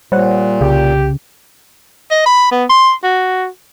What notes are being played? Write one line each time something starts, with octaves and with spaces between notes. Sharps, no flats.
A#2 G3 C5 C#5 F#5
C2 C#3 G4
D#5
B5
B3
C6
F#4